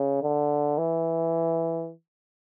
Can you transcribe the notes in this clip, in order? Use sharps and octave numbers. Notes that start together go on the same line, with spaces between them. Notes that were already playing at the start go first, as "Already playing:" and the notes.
Already playing: C#3
D3
E3